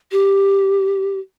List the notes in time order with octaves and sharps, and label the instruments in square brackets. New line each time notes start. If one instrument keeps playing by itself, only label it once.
[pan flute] G4